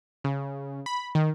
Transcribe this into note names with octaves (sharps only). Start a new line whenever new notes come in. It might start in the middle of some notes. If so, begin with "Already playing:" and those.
C#3
B5
D#3